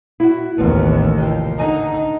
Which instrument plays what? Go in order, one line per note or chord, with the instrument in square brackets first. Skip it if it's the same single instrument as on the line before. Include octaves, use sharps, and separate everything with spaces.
[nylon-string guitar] E4 F#4
[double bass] A1 D#2 [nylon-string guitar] A3 B3 C4
[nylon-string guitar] C3 D#3 F3
[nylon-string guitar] D3 G#5 [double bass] D#4